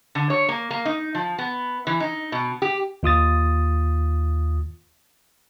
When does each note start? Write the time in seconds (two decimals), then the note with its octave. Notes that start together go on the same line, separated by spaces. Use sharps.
0.15 D3
0.30 C#5
0.49 A#3
0.71 A#3
0.85 D#4
1.15 F3
1.38 B3
1.87 E3
2.00 D#4
2.32 B2
2.62 G4
3.03 D#2 F4 D#6 A6